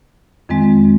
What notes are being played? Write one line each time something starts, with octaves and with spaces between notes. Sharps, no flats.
F2 D#3 G#3 C4